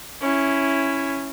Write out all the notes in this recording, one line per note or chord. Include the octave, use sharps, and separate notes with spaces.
C#4 E4